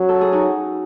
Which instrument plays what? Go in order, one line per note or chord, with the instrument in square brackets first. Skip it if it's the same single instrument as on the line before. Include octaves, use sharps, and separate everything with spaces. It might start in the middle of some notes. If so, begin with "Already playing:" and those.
Already playing: [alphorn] F#3 [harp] C#4 F#4
[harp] A4
G#4
D#4 F#4